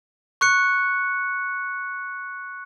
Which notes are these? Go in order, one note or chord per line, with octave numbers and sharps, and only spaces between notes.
C#6 F#6 C#7